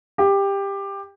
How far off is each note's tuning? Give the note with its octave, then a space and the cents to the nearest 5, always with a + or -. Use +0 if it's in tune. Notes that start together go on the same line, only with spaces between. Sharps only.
G4 +15